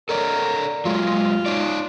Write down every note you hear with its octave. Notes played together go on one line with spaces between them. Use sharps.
A4 A#4 C#5 D5
F#3 G#3 F4
D#4 C#5 D5